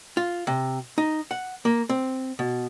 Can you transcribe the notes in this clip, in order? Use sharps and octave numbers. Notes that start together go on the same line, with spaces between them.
F4
C3
D#4
F#5
A#3
C4
B2